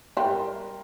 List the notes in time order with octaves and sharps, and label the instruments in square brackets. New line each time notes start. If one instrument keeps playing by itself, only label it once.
[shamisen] G3 E4 [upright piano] A#4 G5 C6